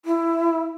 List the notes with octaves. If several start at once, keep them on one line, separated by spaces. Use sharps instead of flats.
E4